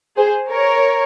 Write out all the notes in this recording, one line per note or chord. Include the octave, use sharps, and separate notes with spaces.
G#4 C5
A#4 C#5